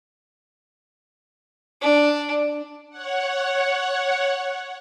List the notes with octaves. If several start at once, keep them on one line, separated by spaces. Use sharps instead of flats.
D4
C#5 F#5